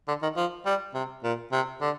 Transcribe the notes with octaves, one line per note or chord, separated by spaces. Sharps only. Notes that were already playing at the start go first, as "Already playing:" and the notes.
D3
D#3
F3
G3
C3
A#2
C3
D3